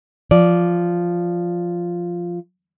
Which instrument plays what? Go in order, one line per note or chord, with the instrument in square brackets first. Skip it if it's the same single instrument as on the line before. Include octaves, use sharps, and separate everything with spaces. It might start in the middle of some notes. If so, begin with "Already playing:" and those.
[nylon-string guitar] F3 D5